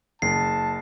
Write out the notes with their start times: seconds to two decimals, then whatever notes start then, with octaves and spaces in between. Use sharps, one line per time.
0.22 F#1 A5 C7